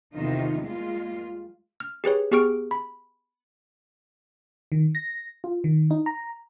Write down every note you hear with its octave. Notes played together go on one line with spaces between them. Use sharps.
E2 C3 D#3 D#4 F4
G3 G#3 A#3 F4
F6
G4 G#4 B4 C#5
B3 G4 G#4 C#6 F6 D7
B5
D#3
A#6
F4
D#3
D#4
A#5